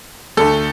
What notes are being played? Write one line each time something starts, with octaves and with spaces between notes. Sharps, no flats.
D2 D3 A3 A4